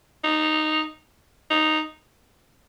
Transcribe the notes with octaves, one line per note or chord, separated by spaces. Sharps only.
D#4
D#4